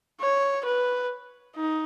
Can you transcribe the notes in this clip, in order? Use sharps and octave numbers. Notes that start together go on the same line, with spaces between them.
C#5
B4
D#4